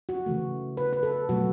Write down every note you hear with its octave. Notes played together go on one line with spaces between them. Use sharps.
F#4
C#3 E3 A3
B4
B4
A4
B2 F#3 A3 F#4